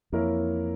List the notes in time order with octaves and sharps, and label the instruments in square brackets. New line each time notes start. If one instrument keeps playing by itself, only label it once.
[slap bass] F2 [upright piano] E3 A#3 E4 A#4 C#5